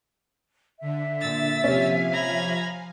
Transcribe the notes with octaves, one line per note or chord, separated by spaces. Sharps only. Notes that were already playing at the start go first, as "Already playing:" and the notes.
D3 E5
A#2 E6 A6
C3 F3 C#4 F5 G#5
A#5 B5 G#6